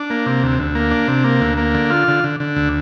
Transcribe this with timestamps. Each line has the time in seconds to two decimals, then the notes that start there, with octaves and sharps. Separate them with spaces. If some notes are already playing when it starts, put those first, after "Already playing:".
Already playing: D4
0.10 A#3
0.26 C3
0.43 D2
0.59 D2
0.75 A#3
0.91 D4
1.08 C3
1.24 A#3
1.41 D2
1.58 A#3
1.75 D3
1.90 F4
2.08 D3
2.24 D3
2.40 D3
2.56 D2